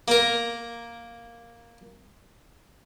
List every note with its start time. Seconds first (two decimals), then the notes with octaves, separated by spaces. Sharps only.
0.08 A#3 A#4